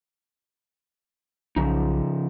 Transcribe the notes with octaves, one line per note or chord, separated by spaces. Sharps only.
B1 C#3 F3 D#4